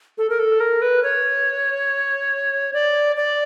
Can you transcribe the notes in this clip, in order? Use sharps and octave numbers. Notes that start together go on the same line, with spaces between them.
A4
A#4
A4
A#4
B4
C#5
D5
D5